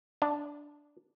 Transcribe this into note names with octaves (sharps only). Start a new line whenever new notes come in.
D4